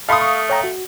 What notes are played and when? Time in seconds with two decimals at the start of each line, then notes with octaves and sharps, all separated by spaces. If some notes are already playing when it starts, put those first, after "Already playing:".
0.09 A3 F5 A5 B5 C6 D#6
0.21 C#6
0.50 C#5 G5 A#5
0.64 F#4